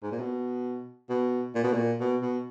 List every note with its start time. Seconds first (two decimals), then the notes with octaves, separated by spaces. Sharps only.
0.03 G#2
0.12 A#2
0.20 B2
1.10 B2
1.55 A#2
1.64 B2
1.74 A#2
2.00 B2
2.22 B2